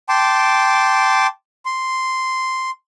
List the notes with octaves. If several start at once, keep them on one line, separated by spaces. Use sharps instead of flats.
G5 A5 C6 D6
C6